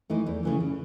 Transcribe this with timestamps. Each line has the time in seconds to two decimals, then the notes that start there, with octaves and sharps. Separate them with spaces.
0.10 E3 A3 D#4
0.26 E2
0.43 C#3 E3 A3
0.60 C#3